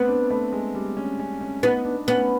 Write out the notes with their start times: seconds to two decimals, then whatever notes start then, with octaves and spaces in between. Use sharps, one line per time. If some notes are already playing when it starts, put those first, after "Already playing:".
Already playing: B3 C4
0.08 D4
0.31 A3
0.52 G#3
0.75 G3
0.97 C#4
1.19 C#4
1.41 C#4
1.63 B3 D#4
1.85 D4
2.07 B3 C#4